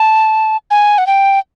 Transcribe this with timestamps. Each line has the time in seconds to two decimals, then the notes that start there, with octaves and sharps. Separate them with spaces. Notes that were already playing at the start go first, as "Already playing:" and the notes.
Already playing: A5
0.71 G#5
0.98 F#5
1.07 G5